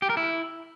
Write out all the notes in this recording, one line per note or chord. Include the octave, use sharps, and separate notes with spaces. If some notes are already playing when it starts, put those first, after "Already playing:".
G4
A#4
E4